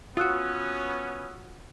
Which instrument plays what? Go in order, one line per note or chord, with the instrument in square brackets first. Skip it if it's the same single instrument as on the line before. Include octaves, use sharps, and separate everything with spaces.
[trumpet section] B3 C#4 [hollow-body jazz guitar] F4 F#4 [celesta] D#6 E6 F#6